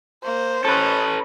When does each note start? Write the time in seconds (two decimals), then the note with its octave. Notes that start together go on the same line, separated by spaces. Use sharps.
0.24 A#3 C5
0.65 C#4 A4 B4 D#5